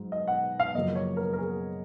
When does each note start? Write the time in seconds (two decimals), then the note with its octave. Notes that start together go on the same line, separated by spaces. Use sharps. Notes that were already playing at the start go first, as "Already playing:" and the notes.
Already playing: G#2 F#3
0.12 D#5
0.28 F#5
0.60 F5
0.75 F#2 C#3 F3 A#3 D#5
0.96 C#5
1.17 A#4
1.33 A#4
1.38 G#4